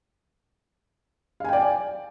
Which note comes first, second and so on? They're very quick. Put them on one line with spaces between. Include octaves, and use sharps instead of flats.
F5 G#5 G5 D5